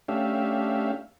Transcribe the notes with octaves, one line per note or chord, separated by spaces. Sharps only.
A3 C#4 D4 G4 E5 F5